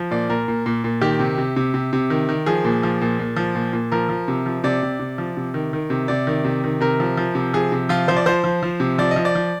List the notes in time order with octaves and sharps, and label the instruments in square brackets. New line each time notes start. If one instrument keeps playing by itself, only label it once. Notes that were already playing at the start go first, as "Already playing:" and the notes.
Already playing: [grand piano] F3
A#2 D5
A#2 A#4
A#2
A#2
A#2
D#3 G4
C3
C3
C3
C3
C3
D#3
D#3
F3 G#4
A#2
F3
A#2
A#2
F3
A#2
A#2
F3 A#4
F3
C3
F3
C3 D5
C3
C3
F3
C3
D#3
D#3
C3
C3 D5
D#3
C3
D#3
C3 A#4
F3
F3
C3
F3 G#4
C3
F3 F4
F3 C5
D5
F3 C5
F3
F3
C3
F3 D5
D#5
F3
D5
F3